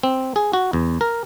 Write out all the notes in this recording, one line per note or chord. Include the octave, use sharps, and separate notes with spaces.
C4
G#4
F#4
E2
A#4